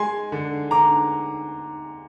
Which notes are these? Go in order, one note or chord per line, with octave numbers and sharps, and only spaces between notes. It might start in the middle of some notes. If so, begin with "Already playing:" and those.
Already playing: G#3 G#5 C6
D3
D3 A#5 D6